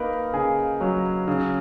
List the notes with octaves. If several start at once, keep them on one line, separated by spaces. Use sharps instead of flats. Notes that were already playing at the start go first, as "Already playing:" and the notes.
Already playing: A#3 D#4 A#4 B4
C#3 G#4
F#3
C#3